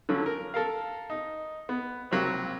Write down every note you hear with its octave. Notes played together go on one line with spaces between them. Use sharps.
D3 F3 F#3 C#4
A#4
A4 A#4 F5
D#4
B3
C#2 C3 F#3 A#3 C4 G4